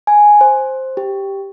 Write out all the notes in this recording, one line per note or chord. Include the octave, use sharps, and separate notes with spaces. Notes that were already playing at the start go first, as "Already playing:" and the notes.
G#5
C5
G4